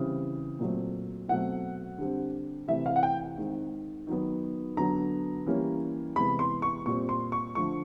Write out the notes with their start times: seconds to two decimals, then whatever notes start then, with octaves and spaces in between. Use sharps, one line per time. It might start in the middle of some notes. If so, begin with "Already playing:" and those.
Already playing: C#3 E3 G3 C4
0.59 A#2 F#3 A3 C4
1.28 B2 F#3 A3 C4 F#5
1.98 D3 G3 C4
2.68 C3 E3 A3 C4 E5
2.86 F5
2.96 F#5
3.03 G5
3.37 D#3 G#3 C4
4.07 D#3 F#3 B3
4.77 D3 F#3 B3 A#5
5.46 E3 G3 A#3 C#4
6.16 C3 E3 G#3 B3 B5
6.39 C6
6.62 C#6
6.86 A#2 G3 C4 C#6
7.09 C6
7.32 C#6
7.55 D3 F3 A3 C#6